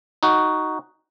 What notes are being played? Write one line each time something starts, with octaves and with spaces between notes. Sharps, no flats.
D#4 F#4